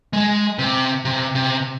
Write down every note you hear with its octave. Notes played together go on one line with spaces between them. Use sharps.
G#3
C3
C3
C3